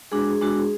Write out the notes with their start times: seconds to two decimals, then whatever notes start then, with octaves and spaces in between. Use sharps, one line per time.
0.11 G#3 D4 F#4 G#4
0.41 G#3 D4 F#4